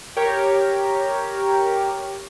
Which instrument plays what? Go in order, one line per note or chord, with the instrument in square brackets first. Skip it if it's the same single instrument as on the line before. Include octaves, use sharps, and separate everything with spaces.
[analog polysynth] G4 A#4 C#5